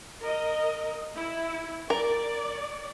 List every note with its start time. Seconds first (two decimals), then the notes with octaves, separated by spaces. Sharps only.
0.21 A#4 D#5
1.15 E4
1.90 A#4 D5